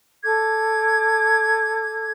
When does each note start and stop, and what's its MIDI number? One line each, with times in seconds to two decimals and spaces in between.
0.22 2.12 69
0.22 2.12 86
0.22 2.12 92